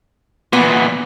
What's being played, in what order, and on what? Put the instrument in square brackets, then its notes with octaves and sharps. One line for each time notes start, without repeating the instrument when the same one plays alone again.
[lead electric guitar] E2 A#2 [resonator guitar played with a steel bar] B3